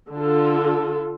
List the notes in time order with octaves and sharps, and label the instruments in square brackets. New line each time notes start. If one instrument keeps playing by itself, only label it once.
[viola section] D3 F4 A4